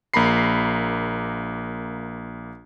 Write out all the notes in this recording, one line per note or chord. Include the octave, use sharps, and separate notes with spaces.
A#1 A#3 A#5 B5 C7